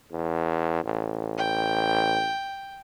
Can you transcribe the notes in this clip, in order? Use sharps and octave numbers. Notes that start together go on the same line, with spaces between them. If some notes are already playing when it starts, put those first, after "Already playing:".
E2
A1
G5